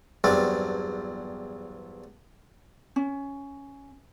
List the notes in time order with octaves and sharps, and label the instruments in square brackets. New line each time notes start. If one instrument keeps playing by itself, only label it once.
[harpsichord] E2 G2 F#3 C4 D4
[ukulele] C#4